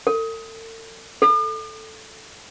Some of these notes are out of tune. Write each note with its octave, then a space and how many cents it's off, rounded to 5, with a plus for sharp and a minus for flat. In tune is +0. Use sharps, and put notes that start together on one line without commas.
A4 +40
A4 +0